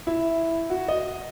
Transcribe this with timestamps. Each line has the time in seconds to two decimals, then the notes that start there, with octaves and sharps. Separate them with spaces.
0.07 E4
0.70 F#4
0.88 D#5